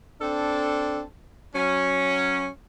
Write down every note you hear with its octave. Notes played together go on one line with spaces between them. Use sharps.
C4 D4 A4
F#3 C#4